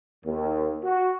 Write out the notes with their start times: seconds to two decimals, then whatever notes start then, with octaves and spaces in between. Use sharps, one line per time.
0.25 D#2
0.84 F#4